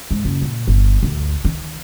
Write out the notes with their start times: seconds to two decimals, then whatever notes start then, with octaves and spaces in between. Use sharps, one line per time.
0.11 G#2
0.25 F#1
0.42 A#2
0.68 G1
1.03 D2
1.45 D#3